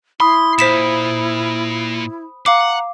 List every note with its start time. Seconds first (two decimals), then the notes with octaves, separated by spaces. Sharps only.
0.20 E4 B5 C6 D#6
0.59 A#2 C5 B6 E7
2.46 F5 F#5 A#5 D6